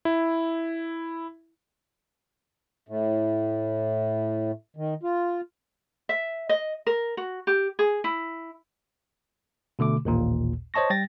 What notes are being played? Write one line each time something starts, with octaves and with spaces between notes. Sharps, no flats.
E4
A2
D#3
F4
E5
D#5
A#4
F#4
G4
G#4
E4
B2 D3 A3 D6
A1 D#2 A#2
C5 C#5 D#5 A5 C#6 A#6
G3 G5 A6 A#6